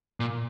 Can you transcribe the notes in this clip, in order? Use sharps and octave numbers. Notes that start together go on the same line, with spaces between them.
A#2